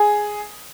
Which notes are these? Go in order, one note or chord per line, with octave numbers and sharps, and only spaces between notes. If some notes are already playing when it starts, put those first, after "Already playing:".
Already playing: G#4